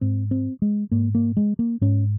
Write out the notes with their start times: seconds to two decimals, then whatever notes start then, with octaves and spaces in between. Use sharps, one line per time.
0.01 G#2 C4
0.31 C4
0.62 G#3
0.91 G#2 A#3
1.15 A#3
1.37 G#3
1.59 A#3
1.81 G#2 C#4